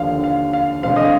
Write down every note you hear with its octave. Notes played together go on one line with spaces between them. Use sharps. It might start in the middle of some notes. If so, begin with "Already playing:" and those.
Already playing: D#2 D3 F3 F5
F5
F5
D2 D3 G#3 C4 F5
D#5
F5